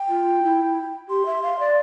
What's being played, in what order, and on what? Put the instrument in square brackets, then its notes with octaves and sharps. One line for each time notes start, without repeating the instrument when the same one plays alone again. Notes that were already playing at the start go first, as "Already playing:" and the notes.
Already playing: [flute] G5
[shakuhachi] F4
E4
[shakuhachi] G4 [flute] C6
[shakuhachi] E5
F5
D5